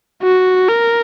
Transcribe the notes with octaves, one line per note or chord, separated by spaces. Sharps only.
F#4
A#4